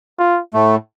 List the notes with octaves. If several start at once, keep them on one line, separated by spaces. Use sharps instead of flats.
F4
A2 A3